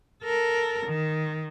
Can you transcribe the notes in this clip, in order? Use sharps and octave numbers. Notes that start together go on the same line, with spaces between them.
A4 A#4
D#3